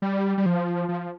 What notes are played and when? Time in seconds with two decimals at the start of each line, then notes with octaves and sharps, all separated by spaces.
0.02 G3
0.38 G3
0.46 F3
0.89 F3